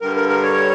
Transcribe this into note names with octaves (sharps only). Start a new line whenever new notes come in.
G2 D3 G3 A#4
A#4
A#4
C#5